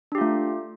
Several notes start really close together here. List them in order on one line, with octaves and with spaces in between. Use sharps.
D4 G4 F4 A3